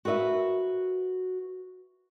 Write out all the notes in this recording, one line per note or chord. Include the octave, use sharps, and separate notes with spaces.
F#4 A#4 B4 D#5 E5